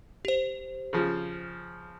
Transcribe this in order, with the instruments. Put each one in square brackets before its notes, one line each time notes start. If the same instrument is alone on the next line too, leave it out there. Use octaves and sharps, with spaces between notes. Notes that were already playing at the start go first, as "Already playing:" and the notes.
[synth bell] G4 C5
[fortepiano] C#3 F3